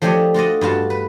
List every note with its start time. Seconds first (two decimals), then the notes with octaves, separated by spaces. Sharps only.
0.02 F3 A3 D4 G4 C#5 D#5
0.34 F4 F#4 D5 D#5
0.61 G2 F4 F#4 A5
0.90 B4